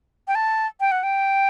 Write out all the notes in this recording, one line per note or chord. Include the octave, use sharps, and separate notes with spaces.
G5
A5
G5
F#5
G5